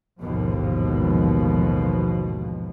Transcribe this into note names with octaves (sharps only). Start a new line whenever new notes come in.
A1 D#2 G#2 B2 F3